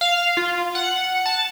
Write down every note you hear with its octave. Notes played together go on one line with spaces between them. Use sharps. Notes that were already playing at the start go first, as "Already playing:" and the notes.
F5
F4
F#5
A5